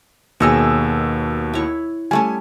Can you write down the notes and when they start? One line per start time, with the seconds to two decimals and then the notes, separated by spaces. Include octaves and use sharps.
0.40 D#2 B2 G#4 C#5 D#5 E6
1.53 E4 C#5
2.11 G3 A3 C#4 G#5